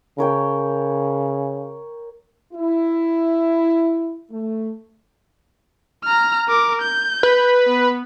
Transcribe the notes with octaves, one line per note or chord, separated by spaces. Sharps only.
C#3 A#4 C#5 G5
E4
A3
A#5 F6
A#4 D6
G6
B4
B3